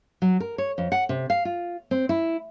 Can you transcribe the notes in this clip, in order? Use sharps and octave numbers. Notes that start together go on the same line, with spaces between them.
F#3
A#4
C#5
F2
F#5
C3
F5
F4
C4
E4